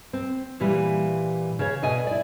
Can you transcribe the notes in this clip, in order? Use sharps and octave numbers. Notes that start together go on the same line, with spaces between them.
C4
A#2 E3 G3
C#3 C#5
B2 A4 D5 D#5 G#5
E4 D5